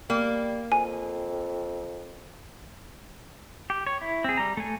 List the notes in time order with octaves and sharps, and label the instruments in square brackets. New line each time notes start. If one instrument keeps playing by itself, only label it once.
[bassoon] G3 [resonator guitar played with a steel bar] A#3
[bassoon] F2 [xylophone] G#5
[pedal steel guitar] G4
C#5
E4
C4 G#4
G3 A#5
A3 G#5